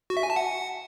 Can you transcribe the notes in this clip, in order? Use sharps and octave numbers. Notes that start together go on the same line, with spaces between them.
F#4
E5
G#5
A5
F#5